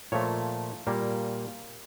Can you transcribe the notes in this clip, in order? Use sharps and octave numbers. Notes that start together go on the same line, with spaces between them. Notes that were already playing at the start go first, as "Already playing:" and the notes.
A#2 F3 A3 C#5
A#2 G3 A#3